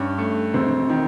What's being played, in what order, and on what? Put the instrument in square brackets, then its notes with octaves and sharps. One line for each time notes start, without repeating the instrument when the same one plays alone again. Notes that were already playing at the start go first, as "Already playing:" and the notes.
Already playing: [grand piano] G2 [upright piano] C#4
[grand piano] A3
[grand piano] E1 [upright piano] C4
[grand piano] D#3